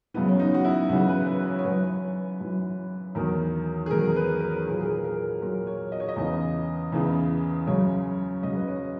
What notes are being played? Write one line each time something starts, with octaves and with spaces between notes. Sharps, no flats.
F#2 C#3 E3 B3
C#4
D#4
F#4
E4
F#2 C#3 E3 F#4
B4
B4
C#5
C#5
F#2 E3 B4
F#2 E3
E2 D#3 F#3 A#4
G#4
E2 D#3 F#3 A#4
B4
A#4
A#2 F#3 G#4
G#4
A#4
A#4
A#2 F#3 A#4
C#5
D#5
C#5
D#5
E2 C#3 E3
E2 C#3 E3
F#2 C#3 F#3 C#5
F#2 C#3 F#3 D#5
B4
C#5